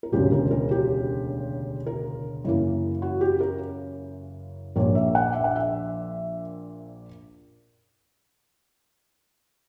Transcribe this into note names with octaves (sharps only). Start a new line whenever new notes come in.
A#4
E1 D2 C#3 G4
A#4
A#4
G4
A#4
F#2 C#3 E3 A#3
F#4
G4
A#4
A#1 A#2 A#3 C#5
E5
F#5
E5
F#5
E5